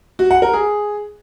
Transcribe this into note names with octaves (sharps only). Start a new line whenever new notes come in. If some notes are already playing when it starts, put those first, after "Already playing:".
F#4
F#5
A#4
G#4